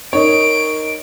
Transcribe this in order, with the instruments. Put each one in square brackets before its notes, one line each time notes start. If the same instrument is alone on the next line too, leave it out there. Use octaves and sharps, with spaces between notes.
[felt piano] D#4 A#4 D#5 [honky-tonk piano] C#5 [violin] D7